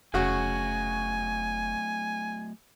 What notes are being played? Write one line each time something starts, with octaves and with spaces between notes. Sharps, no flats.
F1 C#3 F#3 A3 F#4 E5 G#5 C#6